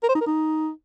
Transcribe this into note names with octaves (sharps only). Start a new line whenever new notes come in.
A#4
C5
D#4
A#4
D#4